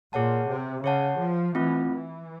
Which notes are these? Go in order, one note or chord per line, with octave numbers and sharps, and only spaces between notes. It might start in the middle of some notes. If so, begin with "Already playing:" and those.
A#2 G#4 C#5 F#5 A5
C3
C#3 G#4 C#5 F#5 A5
F3
E3 A3 C4 F4
E3